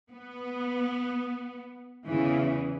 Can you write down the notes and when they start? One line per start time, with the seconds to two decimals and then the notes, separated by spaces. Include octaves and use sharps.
0.11 B3
2.07 E2 C#3 E3